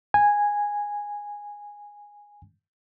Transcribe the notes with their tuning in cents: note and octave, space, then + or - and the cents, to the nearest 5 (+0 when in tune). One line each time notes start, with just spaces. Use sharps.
G#5 -10